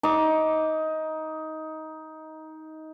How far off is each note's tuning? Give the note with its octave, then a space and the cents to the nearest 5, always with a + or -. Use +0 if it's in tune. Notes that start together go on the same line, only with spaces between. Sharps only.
D#4 +15 D6 +0